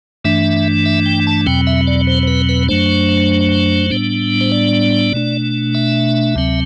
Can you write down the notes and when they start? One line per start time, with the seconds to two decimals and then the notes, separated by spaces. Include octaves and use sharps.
0.25 G2 E3 A3 D4 E5
0.86 E5
1.06 G5
1.27 A5
1.46 E2 B2 F#3 C4 G5
1.67 E5
1.87 D5
2.07 C5
2.23 C5
2.28 B4
2.49 B4
2.68 F#2 F#3 A3 D4 C5
3.90 A2 G3 B3 D4
4.41 C5
4.52 D5
5.14 B2 A3 D4
5.75 E5
6.36 D2 C3 F#3 C4